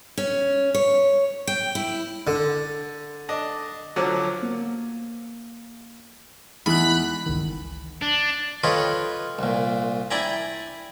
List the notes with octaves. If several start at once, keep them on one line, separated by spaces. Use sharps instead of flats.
C#4
C#5
G5
E4
D3
D4 D#5
D3 F3 F#3
A#3
E2 G#3 D#4 E4 B5 F#6
G1 C#2 D#3
D4
F4 A4 B4 C#5 D#5 G5
C2 A#2
E4 D5 E5 G5 G#5 A#5